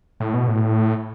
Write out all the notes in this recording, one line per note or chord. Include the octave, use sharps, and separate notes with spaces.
A2
B2
A2